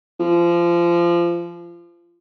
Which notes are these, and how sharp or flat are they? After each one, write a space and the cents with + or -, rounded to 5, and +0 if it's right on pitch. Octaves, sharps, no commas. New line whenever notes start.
F3 -25